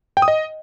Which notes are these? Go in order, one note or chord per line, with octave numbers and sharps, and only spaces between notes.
G5
D#6
D#5